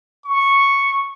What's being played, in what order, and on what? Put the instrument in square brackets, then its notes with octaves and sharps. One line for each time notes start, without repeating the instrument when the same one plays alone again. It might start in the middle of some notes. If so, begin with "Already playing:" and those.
[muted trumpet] C#6